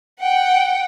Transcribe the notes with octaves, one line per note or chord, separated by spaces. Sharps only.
F#5 G5